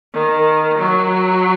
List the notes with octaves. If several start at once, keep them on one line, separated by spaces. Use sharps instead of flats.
D#3
F#3